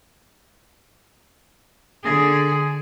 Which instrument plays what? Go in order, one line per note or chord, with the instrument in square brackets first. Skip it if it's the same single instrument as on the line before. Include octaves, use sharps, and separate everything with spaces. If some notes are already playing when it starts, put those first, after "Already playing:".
[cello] D3 G#4